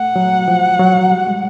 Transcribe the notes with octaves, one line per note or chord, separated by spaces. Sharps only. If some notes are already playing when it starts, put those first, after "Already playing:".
Already playing: A3 F#5
F#3
F3
F#3
G3
G#3